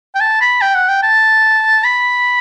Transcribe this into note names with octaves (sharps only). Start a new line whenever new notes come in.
G5
A5
B5
G5
F#5
G5
A5
B5